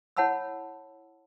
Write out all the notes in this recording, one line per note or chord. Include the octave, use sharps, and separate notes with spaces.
E4 C#5 F#5 A5 B5 E6